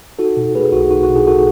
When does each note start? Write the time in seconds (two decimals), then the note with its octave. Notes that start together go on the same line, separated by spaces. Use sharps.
0.19 D#4 F#4 A4
0.37 B2
0.55 A3 G#4 B4
0.72 B1 F#4
0.91 D#4 F#4
1.03 F#4
1.10 B2
1.15 E4 G#4
1.27 A3 F#4 A4